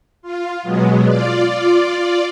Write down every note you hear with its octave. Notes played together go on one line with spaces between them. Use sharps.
F4
B2 F#3 G#3 B3
F4 D5